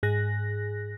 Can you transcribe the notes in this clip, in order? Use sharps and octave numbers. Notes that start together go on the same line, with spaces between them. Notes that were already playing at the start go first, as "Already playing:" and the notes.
G#2 G#4 F#6 A#6